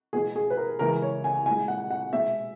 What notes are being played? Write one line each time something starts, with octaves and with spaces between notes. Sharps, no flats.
B2 G#3 G#4
G#4
B4
A#4
C#3 E3 G#3 A#4
C#5
G#5
A#2 G#3 G#5
F#5
F#5
B2 G#3 E5